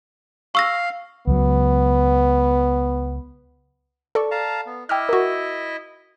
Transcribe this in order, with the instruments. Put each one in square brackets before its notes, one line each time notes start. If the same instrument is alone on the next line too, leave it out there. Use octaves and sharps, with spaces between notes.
[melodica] F5 [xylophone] C#6 E6 A#6
[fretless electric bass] C#2 F#3 [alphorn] B3
[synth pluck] A4 D5 C#6
[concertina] F5 A5 A#5
B3
[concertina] E4 D#5 E5 [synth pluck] G5 D6 F6
[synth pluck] F#4 A#4